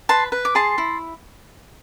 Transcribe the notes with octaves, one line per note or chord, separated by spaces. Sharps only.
B4 A5 C6
B4
D6
G#4 A5 C6
E4